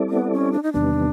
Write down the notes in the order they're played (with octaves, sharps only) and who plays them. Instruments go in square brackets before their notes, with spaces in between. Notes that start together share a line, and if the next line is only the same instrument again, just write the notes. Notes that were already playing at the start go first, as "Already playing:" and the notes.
Already playing: [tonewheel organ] G3 C4 E4 A4 D5
[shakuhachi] B3
C#4
D4
D#4
[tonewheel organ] E2 C3 D#3 G3 B3 [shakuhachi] D4